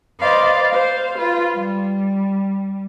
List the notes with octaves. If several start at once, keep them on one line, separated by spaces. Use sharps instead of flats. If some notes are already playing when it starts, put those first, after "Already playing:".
B4 C5 D5 D#5 F5
C5 F5
F4 B4
G3